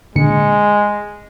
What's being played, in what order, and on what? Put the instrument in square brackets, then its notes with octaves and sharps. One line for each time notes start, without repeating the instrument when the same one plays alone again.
[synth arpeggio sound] A#2 D3 C#7 [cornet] G#3